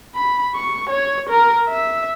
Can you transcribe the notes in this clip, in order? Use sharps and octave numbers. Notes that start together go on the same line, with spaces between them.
B5
C#6
C#5
A#4
E5